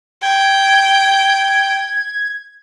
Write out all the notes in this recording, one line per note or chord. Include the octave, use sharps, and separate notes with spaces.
G5 G#6